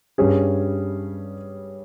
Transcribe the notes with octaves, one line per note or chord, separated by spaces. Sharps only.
G2 G3 C#4 G#4